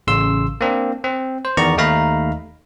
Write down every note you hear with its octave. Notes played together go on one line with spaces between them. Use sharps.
A1 C#3 C6 E6
A#3 C4 D4
C4
C5
E2 D#3 B3 D5 A#5 C#6
D#2 A3 D#4 F5 A#5 B5